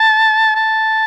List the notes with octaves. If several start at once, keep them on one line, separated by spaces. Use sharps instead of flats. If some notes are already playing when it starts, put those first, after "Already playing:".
Already playing: A5
A5